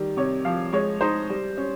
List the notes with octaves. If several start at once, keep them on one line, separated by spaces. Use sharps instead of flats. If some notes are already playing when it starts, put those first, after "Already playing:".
Already playing: D#3 G3
C3 C#5
F3 F5
G#3 C#5
D#4 C5
G3
C#4